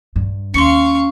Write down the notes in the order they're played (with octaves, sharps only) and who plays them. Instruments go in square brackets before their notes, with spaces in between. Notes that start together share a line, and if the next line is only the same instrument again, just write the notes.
[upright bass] G2
[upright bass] D#2 [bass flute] C#4 [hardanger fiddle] F5 C#6 [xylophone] C6 C#7